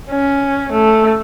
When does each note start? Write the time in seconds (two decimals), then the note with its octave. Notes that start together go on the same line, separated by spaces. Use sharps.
0.10 C#4
0.72 A3